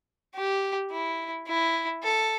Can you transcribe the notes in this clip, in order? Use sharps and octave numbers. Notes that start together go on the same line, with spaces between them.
G4
E4
E4
A4